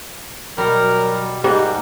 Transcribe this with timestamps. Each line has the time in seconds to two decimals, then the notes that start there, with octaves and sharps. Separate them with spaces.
0.58 B2 F#3 G3 A#4
1.44 G#2 G3 A#3 F#4 G4